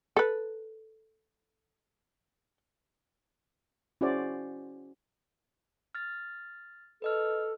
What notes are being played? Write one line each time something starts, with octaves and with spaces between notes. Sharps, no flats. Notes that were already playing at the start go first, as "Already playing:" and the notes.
A4 B4
C#4 E4 F#4 G#4 C5 D5
F6 A6
A4 B4 D#5 F6